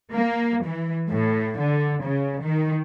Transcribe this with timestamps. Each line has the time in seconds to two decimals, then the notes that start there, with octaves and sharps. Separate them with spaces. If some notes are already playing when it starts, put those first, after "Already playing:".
0.13 A#3
0.65 E3
1.09 A2
1.59 D3
2.02 C#3
2.43 D#3